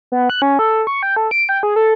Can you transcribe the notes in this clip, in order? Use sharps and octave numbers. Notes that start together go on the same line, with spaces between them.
B3
F#6
C#4
A4
C#6
G5
A4
D7
G5
G#4
A4